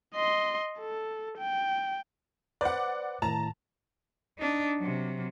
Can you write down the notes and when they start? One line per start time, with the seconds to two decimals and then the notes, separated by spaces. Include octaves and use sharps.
0.15 D#5 C6
0.79 A4
1.38 G5
2.61 B4 C5 D5 F#5 D6
3.22 A2 D#3 A5 A#5
4.39 D4 D#4
4.79 C3 F#3